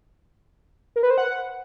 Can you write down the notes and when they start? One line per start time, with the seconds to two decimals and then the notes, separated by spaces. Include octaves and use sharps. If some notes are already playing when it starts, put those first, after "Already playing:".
0.96 A#4
1.03 B4
1.10 C5
1.18 F#5